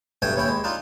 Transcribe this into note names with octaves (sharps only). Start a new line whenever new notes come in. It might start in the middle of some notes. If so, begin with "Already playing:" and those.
B1 G2 A3 D4 G5 G#5
D#2 C#4 E4 G5
G#3
D4 D#4 F4